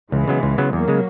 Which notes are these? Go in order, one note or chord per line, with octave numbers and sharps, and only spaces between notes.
C#2 E3 G#3
C#3 F#3 B3
C#2
C#3 F#3 B3
E2 F#3 A#3
C#3 G#3